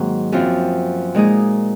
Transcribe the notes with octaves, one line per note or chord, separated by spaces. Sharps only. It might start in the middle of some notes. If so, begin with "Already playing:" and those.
Already playing: G#2 D#3 F#3 A#3 C4
F#2 F3 C4 F4
A#2 G#3 D#4 G#4